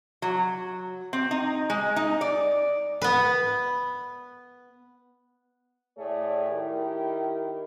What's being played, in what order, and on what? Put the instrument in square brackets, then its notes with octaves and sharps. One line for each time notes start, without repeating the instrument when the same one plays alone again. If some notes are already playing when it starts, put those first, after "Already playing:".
[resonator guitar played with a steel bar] F#3
C4
D#4
G#3
D#4
D5
[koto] B3 B4
[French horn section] A2 A3 G#4 C#5 D5
D#3 E4 G4 A#4